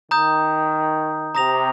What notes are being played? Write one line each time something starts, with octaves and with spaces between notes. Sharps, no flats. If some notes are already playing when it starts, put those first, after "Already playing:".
D#3 A#5 D#6 G6
C3 A#5 D#6 A#6 F7